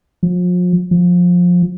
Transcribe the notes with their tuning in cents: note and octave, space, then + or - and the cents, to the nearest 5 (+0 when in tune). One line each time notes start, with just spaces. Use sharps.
F3 +40
F3 +20